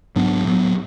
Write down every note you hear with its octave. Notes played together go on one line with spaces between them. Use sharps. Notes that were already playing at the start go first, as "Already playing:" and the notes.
G#2 F#3 B3 D4
A2 F#3 B3